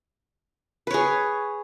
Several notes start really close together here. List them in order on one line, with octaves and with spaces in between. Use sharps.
B4 C#5 G#4